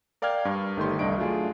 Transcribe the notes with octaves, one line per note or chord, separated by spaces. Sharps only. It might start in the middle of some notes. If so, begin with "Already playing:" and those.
A#4 D5 F5 G5 F6 G#6
G2
G1 D#3 A3 G4 C6
C2 G2 A3 D4 D#5 D7
F#3 A3 D4 F4 G#4